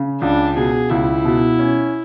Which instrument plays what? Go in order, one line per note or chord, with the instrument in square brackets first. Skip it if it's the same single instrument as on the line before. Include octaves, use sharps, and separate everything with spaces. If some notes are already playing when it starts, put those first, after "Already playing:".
Already playing: [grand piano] C#3
[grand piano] C#2 [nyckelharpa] D4
[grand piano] B2 [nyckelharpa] G#4
[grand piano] C#2 [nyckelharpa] E4
[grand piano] B2
C#4